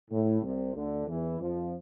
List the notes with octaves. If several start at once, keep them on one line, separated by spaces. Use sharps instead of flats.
A2
C2 C3
D2 D3
E2 E3
F2 F3